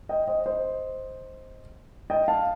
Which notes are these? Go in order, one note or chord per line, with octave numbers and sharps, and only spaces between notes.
D#5 G5
C5 D#5
C5 D#5
D#5 G5
F5 A5